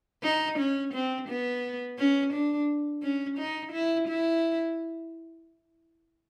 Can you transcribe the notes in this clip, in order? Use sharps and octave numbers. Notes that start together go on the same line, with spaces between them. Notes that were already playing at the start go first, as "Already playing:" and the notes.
D#4
C#4
C4
B3
C#4
D4
C#4
D#4
E4
E4